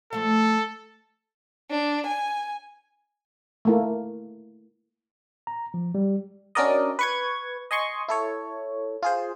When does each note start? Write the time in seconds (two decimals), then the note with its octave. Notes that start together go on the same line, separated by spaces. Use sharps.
0.13 F3 A3 A4 F5
1.71 D4
2.07 G#5
3.65 A3 A#3 E4
5.47 A#5
5.74 F3
5.95 G3
6.55 C#4 D4 F#4 A#4 D5 D#5
6.99 B4 C#6 G#6
7.71 D#5 G#5 C6 C#6
8.08 E4 A4 C#5
9.03 F4 G#4 C5